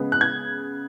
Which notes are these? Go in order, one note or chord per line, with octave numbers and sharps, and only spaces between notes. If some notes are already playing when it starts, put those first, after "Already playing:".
Already playing: C#3 G#3 B3
F#6
G#6